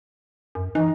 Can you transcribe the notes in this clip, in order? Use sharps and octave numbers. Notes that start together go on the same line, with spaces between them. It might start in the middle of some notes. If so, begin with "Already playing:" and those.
F#2
E3 D#4